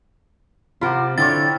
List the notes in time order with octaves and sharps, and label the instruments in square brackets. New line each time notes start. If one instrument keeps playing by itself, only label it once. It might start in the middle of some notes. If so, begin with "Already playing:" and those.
[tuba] C3 [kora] F4 A#4 C5 [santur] D5 F#5 B5
[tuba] D3 [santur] G3 C4 F4 [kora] E4 C#5 [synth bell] A6